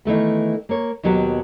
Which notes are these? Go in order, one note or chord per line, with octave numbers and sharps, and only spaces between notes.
D#3 E3 A3 B3
A#3 C#5
D#2 B2 F#3 B3 G4